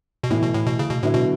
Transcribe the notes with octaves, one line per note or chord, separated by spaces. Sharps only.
B2
A2 E3 A3 E4
B2
A2
B2
C#3
B2
A2 D3 F#3 B3 E4
B2